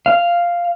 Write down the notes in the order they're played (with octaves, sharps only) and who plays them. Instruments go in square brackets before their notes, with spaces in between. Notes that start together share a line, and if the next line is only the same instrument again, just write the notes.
[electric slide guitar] F5